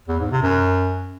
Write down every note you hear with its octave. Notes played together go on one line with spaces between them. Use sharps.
E2
G#2
C3
F#2